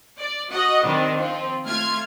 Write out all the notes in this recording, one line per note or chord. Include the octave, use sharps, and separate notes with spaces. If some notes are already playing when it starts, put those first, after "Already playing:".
D5
F#4 D#5 F#5
D#3 G3 C4 D4
F3 C4
A3 F4 F6 G#6